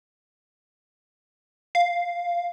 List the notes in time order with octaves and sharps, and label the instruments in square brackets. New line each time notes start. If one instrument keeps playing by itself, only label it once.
[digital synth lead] F5